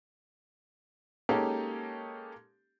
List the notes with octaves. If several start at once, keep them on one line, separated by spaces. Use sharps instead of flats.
G#3 A#3 C#4 D#4 G4 A4